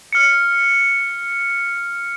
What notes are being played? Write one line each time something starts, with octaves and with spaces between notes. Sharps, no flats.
F6 C#7